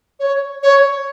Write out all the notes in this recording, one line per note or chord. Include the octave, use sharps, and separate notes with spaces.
C#5
C#5